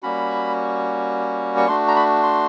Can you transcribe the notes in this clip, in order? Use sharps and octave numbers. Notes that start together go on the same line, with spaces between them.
G3 A#3 C#4 F#4 B5
C#6
A3 D4 F#4 C6
A#5
B5
C6